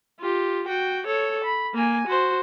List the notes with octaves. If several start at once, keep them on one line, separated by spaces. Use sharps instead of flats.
F4 G4
F#4 G5
A4 C#5
B5
A#3 G#5
F#4 C5